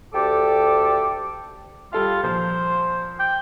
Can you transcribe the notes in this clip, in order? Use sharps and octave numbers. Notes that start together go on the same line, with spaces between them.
D2 G4 A4 D5 D6
G3 F4 A4 F5
A#2 F3 C5
G5